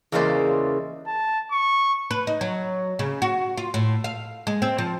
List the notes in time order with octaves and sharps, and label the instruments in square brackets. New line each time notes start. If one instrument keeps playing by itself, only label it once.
[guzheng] E2 C#3 G#3 A#3 C5 D5
[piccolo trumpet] A5
C#6
[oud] B4
D#4
F#3
C#3
F#4
F4
A2
F5
G#3
C4
F3